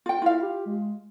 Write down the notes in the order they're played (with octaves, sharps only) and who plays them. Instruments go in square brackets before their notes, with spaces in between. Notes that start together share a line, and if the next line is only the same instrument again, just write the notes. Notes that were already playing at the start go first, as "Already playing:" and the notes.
[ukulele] F4 G5
[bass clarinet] E4 [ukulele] F4 F5
[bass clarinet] G4
G#3